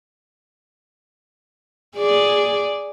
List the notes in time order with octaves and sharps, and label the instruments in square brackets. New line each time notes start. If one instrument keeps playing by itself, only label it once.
[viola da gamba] G#4 D5